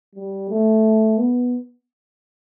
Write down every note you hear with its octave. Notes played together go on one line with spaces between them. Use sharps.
G3
A3
B3